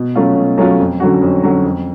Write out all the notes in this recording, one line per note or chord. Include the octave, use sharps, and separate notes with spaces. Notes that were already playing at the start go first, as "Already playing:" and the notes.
Already playing: B2
F#3 A3 C#4 F4
B2
F#3 A3 C#4 F4
F2
D3 F#3 C#4 F#4
F2
D3 F#3 C#4 F#4
F2